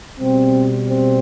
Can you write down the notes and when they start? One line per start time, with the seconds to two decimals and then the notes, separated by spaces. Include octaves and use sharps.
0.19 B2 G3 C4
0.87 C4